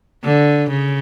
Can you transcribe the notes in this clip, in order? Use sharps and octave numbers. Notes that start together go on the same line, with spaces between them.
D3
C#3